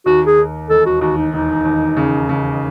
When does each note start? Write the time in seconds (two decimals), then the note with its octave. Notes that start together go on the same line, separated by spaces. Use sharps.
0.06 D#2 F#4
0.26 G#4
0.38 D#2
0.70 E1 A4
0.86 F#4
1.01 D#2 F#4
1.17 D#4
1.33 E1 D#4
1.65 D#2
1.97 C#3
2.29 C#3